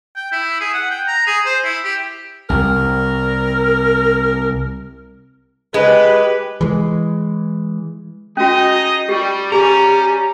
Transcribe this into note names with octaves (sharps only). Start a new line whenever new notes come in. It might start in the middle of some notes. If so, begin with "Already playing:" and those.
G5
E4
G#4
F#5
G5
A#5
G#4
C5
E4
G4
C2 A#4
G#3 G4 B4
E3 G#3
C#4 D#4 F#4 G#4 D#5
G3 G4
G3 C#4 G4 G#4 A#5